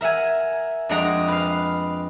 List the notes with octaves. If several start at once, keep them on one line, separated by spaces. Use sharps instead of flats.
A#4 E5 F#5 G#5
F2 G#3 D4 G#4 F#5 A#5
B4 F5